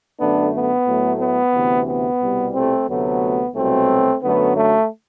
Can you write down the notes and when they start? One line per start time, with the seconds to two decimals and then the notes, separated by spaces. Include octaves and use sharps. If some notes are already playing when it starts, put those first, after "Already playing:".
0.18 F#2 D3 A3 B3 D4
0.53 B3
0.86 A2 F#3 A3
1.20 B3
1.53 D2 C3 E3
1.87 B3
2.21 C2 B2 G3
2.55 A3 C4
2.88 D2 C3 F#3 A3 B3
3.55 C2 B2 F#3 A3 C4
4.22 F#2 D3 F#3 A3 B3
4.56 A3